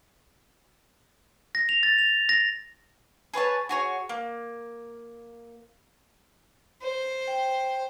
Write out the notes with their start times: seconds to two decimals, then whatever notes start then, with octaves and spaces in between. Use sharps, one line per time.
1.55 A#6
1.69 F7
1.83 A6
1.98 F7
2.29 A#6
3.34 G#4 B4 C#5 A5
3.69 F#4 G#4 C#5
4.09 A#3
6.82 C5
7.27 G5